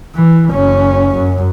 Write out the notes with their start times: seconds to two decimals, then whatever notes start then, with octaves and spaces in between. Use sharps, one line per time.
0.15 E3
0.50 F#1 C#4
1.16 F#2